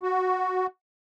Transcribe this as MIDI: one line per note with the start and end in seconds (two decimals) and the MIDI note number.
0.03 0.67 66